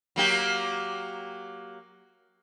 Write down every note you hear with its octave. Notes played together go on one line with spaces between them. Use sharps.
F#3 A#3 G4